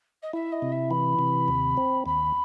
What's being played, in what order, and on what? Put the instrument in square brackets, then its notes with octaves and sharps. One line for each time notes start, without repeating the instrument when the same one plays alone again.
[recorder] D#5
[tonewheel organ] E4 [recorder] E5
[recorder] D#5
[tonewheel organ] C3
[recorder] E5
[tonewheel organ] E3 [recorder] B5
[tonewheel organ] C3
D#2
C4
[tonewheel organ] D#2 [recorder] B5